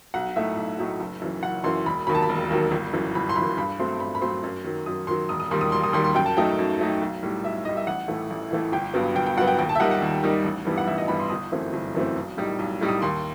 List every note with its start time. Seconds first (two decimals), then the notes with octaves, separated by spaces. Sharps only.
0.14 B1 F#5
0.36 A2 F#3 A3 D#4 E5
0.57 B1
0.78 A2 F#3 A3 D#4
1.00 F#1
1.21 F#2 E3
1.43 F#1 F#5
1.64 F#2 E3 C6
1.86 E1 B5
2.07 D#2 D#3 F#3 B5
2.15 A5
2.23 B5
2.29 E1
2.51 D#2 D#3 F#3
2.71 G1
2.93 F#2 E3
3.15 G1 B5
3.29 C6
3.36 F#2 E3 B5
3.57 G2 B5
3.79 F#3 A3 C4 C6
4.00 G2 B5
4.15 B5
4.22 F#3 A3 C4 C6
4.43 F#2
4.64 D#3 F#3
4.86 F#2 D#6
5.07 D#3 F#3 C6
5.29 E1 D#6
5.40 D#6
5.51 D#2 D#3 G3 C6
5.61 D#6
5.72 E1 C6
5.84 D#6
5.93 D#2 D#3 G3 C6
6.04 C6
6.15 F#2 G5
6.26 A5
6.37 F#3 A3 D#4 G5
6.59 F#2
6.79 F#3 A3 D#4
7.02 B1
7.23 A2 G3
7.43 B1 E5
7.65 A2 G3 D#5
7.77 E5
7.87 A1 F#5
8.08 A2 E3 A3
8.30 A1
8.51 A2 E3 A3
8.72 G1 G5
8.94 G2 F#3 B3
9.15 G1 G5
9.26 G5
9.37 G2 F#3 B3 F#5
9.47 G5
9.58 D#2 G5
9.69 A5
9.75 E5
9.80 D#3 G3 D#4 F#5
9.91 F#5
10.02 D#2
10.23 D#3 G3 D#4
10.44 A1
10.65 G2 E3 G3 B3
10.78 F#5
10.87 A1 E5
10.98 D#5
11.08 G2 E3 G3 B3 B5
11.20 C6
11.30 G1 D#6
11.52 F#2 E3 A3 C4
11.73 G1
11.95 F#2 E3 A3 C4
12.16 B1
12.37 A2 G3 D#4
12.59 B1
12.81 A2 G3 D#4
12.89 D#6
13.02 D#2 C6